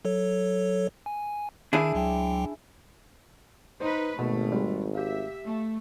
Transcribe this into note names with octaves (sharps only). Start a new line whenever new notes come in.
F#3 A4 C#5
G#5
D#3 D4 E4 G#4
C#2 F#3 G5
D#4 B4 C5
G#1 B2 A3
G3 G#3
G4 E5 F5
A3